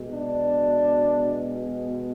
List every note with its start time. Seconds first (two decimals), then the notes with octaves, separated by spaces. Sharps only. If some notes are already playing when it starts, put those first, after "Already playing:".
Already playing: B2 G#3
0.12 D4